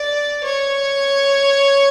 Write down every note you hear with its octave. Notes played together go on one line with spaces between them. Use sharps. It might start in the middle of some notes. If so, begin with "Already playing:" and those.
Already playing: D5
C#5